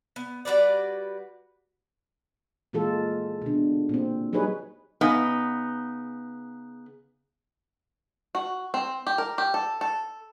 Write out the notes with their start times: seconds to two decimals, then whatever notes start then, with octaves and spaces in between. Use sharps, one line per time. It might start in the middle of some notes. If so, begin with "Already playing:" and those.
0.16 B3
0.45 G3 F#4 B4 D5
2.73 A#2 E3 G#3 F4 A4
3.42 B2 D3
3.89 A#2 C4
4.33 F#3 G3 D#4 G#4 B4 C#5
5.01 C#3 B3 D#4
8.35 F#4
8.74 C4
9.07 G4
9.18 A#4
9.38 G4
9.54 A4
9.81 A4